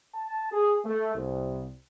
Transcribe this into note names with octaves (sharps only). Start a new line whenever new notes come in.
A5
G#4
A3
C2